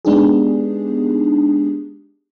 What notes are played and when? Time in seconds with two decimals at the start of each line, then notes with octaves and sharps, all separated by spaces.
0.05 G#3 B3 D4 D#4 G4 G#4